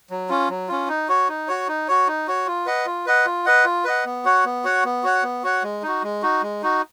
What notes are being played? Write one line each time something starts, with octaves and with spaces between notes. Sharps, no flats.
F#3
C#4 F4
F#3
C#4 F4
D#4
F#4 C#5
D#4
F#4 C#5
D#4
F#4 C#5
D#4
F#4 C#5
F4
B4 D#5 F#5
F4
B4 D#5 F#5
F4
B4 D#5 F#5
F4
B4 D#5 F#5
B3
F#4 C#5 F#5
B3
F#4 C#5 F#5
B3
F#4 C#5 F#5
B3
F#4 C#5 F#5
G#3
D#4 F#4
G#3
D#4 F#4
G#3
D#4 F#4